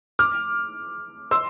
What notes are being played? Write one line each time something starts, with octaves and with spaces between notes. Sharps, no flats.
D6 F6
C6 E6